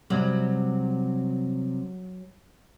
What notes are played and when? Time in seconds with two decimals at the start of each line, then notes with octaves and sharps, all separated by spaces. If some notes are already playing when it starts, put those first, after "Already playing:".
0.10 C3 F#3 G3